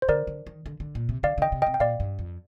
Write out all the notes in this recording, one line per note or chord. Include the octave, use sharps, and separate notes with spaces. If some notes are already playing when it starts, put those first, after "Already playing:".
C5
D3 A#4 D5
D3
D#3
D3
D3
A#2
C3
D3 D5 F5
D3 D#5 G5
C3
C3 D#5 G5
G5
A#2 D5 F5
G2
F2